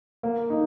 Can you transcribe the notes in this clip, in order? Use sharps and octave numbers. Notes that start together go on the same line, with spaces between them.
A#3
D#4